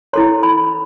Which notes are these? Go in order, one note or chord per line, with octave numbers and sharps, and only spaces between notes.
E4 A4 C#5 C6
B5